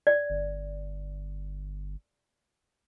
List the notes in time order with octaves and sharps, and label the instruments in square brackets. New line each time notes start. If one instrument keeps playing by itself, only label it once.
[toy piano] D5
[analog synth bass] G1